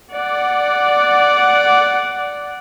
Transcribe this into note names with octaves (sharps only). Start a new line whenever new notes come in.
D5 F#5